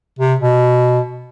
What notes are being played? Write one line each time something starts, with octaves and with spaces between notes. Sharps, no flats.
C3
B2